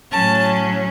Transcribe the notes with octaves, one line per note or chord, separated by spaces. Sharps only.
A2 F#3 C#4 A5